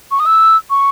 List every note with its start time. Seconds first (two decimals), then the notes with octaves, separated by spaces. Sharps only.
0.11 C#6
0.20 D#6
0.26 E6
0.70 C#6